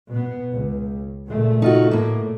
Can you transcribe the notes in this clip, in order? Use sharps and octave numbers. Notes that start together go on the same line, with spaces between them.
B2 B3
C#2
A#2 C#3 A3
D#4 F4 F#4
A2 A#3